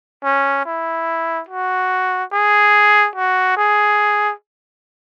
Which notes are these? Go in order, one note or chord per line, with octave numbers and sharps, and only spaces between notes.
C#4
E4
F#4
G#4
F#4
G#4